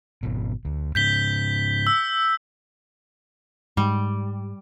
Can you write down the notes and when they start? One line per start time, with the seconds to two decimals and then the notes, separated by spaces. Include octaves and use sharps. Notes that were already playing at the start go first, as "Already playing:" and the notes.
0.23 G#1 B2
0.65 D2
0.95 G#2 C#3 G6 B6 G7
1.87 E6
3.77 G#2 G3